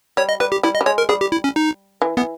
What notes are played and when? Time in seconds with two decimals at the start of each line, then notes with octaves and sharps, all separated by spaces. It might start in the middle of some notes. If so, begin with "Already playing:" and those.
0.17 G3 C#5
0.29 D#5
0.40 G3 B4
0.52 G4
0.63 G3 E4
0.75 D#5
0.81 G3
0.86 G#3 C#5
0.98 A#4
1.09 G3 G#4
1.21 G4
1.32 E4
1.44 C#4
1.56 D#4
2.02 E3
2.17 E3 B3